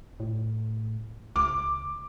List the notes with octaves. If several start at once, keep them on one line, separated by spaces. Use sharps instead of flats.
A2
C#2 D6